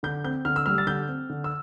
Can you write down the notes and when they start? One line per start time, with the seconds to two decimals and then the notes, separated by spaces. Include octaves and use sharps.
0.03 D3 G6
0.24 C4 G6
0.45 D3 F6
0.56 E6
0.66 G3 F6
0.78 A6
0.87 D3 G6
1.08 C4
1.30 D3
1.44 E6